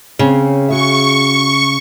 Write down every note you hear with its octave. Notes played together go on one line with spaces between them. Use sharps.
C#3 C4 C#4 C#5
F#4 G#4 E5 C#6